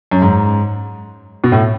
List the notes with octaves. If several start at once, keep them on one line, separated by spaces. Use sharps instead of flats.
F#2
G#2
B2
A2